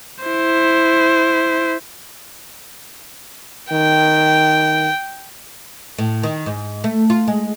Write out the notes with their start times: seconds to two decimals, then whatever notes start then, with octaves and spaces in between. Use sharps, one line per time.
0.25 E4 C5
3.72 D#3 G5
5.98 A2
6.23 D#3
6.46 G#2
6.84 A3
7.10 F4
7.28 G#3